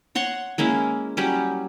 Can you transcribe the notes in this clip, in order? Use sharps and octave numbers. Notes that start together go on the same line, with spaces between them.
C#5 F#5 C6 C#6
G#3 A#3 C#4 E4
F#3 G3 C#4 G4